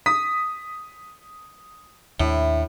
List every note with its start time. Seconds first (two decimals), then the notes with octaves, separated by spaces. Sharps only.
0.06 D#6 B6
2.20 D#2 A2 D4 E4